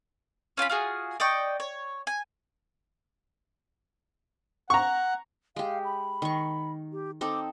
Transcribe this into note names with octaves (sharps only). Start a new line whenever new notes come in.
C#4 F4 G5 B5
F4 F#4 G#4
D5 D#5 G5 C#6
C#5
G#5
F#5 A#5 C#6
G#3 G4 F5
B5
D#3 C#6
G4
C4 D#4 A4 D6